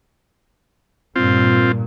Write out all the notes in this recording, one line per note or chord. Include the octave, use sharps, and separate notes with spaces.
G2 A#2 C4 F4